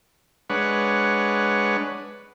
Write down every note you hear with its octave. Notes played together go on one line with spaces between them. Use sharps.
G#3 D4 B4 C#5 F#5